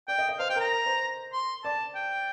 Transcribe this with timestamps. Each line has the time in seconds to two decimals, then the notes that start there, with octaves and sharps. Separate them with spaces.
0.08 D5 G5
0.19 D#5
0.29 D#5
0.39 C5 F5
0.50 G5
0.56 A#4
0.60 A#5
0.86 C5
1.33 C6
1.64 D5 A5
1.95 G5